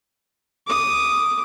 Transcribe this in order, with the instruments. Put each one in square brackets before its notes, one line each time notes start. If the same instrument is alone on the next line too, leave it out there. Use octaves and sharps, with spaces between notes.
[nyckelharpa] D6 D#6